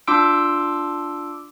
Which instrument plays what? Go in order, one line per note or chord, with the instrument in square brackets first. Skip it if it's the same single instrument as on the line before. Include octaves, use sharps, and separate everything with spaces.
[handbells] D4 F4 C6 D6 E6 D7